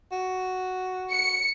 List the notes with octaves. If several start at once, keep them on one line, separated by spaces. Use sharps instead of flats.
F#4
C#7